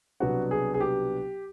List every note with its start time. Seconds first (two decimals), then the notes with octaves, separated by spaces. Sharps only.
0.20 C2 B2 F#3 B3 D4 F#4
0.51 G#4
0.74 G#4
0.80 G4